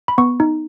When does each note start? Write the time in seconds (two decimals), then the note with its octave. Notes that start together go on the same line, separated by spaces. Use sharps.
0.08 B5
0.18 B3 C#6
0.40 D#4